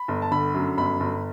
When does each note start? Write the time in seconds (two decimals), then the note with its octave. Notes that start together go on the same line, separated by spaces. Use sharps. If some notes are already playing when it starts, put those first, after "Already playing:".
Already playing: B5
0.08 G1
0.22 A5
0.31 D3 B5
0.54 F#2
0.78 G1 B5
1.00 G1